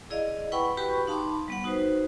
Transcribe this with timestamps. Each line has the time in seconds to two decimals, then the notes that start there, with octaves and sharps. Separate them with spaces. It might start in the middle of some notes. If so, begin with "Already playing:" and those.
0.10 E4 G#4 D5 D#5 F5
0.52 E4 B4 F#5 G5 B5 C#6
0.77 F#4 G4 B4 G5 B5 C#6
1.07 D#4 F5 A5 B5 C6 D6
1.48 G3 B3 F#5
1.64 D#4 F#4 B4 C5